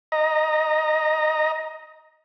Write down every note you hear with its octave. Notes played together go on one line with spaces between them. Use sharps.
D#5 A#5